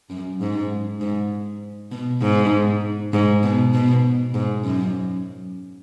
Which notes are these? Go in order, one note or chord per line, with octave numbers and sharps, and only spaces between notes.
F#2
G#2
G#2
B2
G#2
G#2
B2
B2
G#2
F#2